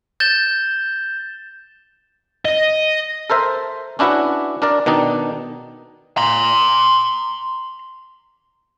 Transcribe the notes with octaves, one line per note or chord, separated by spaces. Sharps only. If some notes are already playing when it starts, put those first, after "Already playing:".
G6 A6 E7 G7
D#5
A4 A#4 C5 E5
C#4 D4 E4 F#4 B4 F#5
D4 A#4 D5
B2 D#3 D4 D#4
A#5 C6